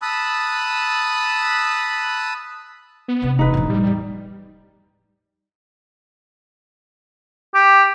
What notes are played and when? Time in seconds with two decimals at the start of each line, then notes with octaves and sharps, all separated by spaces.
0.02 A5 B5 D#6 E6 F#6
3.08 B3
3.22 C3 D4
3.39 E1 D#4 B4
3.54 A2 F3
3.70 G3
3.87 E2
7.55 G4